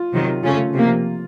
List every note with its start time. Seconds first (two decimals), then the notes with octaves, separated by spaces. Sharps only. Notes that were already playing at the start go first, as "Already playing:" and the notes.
Already playing: F4
0.12 C3 D#3 F#3
0.43 C#3 A3 C#4 F4
0.74 C3 F3 A#3